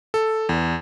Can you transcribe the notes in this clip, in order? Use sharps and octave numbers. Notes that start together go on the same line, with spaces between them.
A4
E2